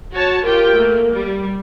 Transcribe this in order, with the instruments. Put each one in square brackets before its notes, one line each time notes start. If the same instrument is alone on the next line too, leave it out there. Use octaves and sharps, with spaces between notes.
[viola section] F#4 C#5 A5
[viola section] F4 G4 G5 [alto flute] A#4
[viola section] A3 A#3
G3